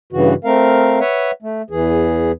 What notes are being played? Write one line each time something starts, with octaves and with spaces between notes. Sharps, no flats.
G2 C#3 E3 F#4
A3 C4 A#4 F5
B4 C#5 E5 F#5
A3
E2 E3 G#4